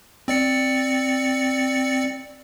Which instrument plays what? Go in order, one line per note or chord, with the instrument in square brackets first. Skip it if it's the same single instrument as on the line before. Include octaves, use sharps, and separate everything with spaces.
[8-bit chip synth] C4 D5 C#7